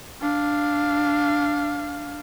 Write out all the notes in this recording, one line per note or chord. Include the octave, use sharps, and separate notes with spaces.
D4 F5